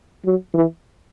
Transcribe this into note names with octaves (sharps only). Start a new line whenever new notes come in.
F#3
E3